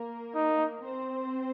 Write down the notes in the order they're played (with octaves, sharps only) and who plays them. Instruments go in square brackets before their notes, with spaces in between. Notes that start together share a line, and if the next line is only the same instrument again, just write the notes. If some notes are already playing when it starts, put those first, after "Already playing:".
Already playing: [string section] A#3 A#4
[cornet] D#4
[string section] C4 C5